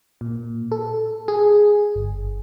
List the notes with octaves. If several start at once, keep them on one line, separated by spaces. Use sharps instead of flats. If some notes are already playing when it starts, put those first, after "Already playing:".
A#2
A4
G#4
G1